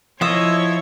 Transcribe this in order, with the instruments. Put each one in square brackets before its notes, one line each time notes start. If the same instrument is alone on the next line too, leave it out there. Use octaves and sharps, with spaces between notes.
[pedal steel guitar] F3 D#5 [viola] E4 C#5 [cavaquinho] F4 E5 D#6